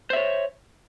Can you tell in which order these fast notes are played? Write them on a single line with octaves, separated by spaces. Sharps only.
C5 E5 C#5